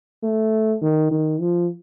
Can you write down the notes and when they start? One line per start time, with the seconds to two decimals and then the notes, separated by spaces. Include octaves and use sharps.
0.23 A3
0.82 D#3
1.11 D#3
1.41 F3